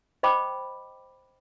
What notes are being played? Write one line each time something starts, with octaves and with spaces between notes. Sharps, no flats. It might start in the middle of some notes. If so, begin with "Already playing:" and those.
C5 D#5 G5 B5 D6